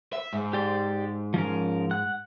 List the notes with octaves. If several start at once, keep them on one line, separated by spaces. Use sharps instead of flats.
E5
G#2
G4 D5 C6
F3 C#4 A#4
F#5 F#6